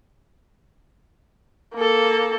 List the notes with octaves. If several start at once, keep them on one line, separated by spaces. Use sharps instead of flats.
A#3 A4